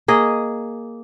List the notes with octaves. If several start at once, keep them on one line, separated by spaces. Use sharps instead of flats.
A#3 G#4 D#5